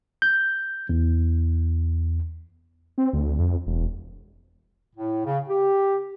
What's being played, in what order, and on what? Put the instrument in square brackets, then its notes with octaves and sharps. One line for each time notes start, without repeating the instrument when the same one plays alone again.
[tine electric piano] G6
E2
[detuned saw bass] C4
D2
F2
E1
[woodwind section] A2
C#3
G4